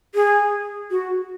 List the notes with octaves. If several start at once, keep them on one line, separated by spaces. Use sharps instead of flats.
G#4
F#4